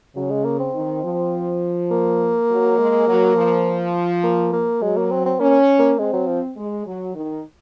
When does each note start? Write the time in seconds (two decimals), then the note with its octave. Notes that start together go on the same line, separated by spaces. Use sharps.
0.16 C#3 F#3
0.30 G#3
0.45 A#3
0.60 C4
0.74 D#3
1.04 F3
1.91 A#3
2.50 F#3
2.78 G#3
3.08 F#3
3.36 F3
4.24 A#3
4.53 A#3
4.82 F#3 G#3
4.97 A#3
5.11 C4
5.26 C4
5.40 A#3 C#4
5.79 A#3
5.99 G#3 C4
6.13 F#3
6.28 F3
6.57 G#3
6.86 F#3
7.15 D#3